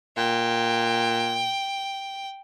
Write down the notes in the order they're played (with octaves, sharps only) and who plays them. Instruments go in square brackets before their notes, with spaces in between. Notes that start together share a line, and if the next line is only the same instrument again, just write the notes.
[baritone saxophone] A#2 [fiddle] G5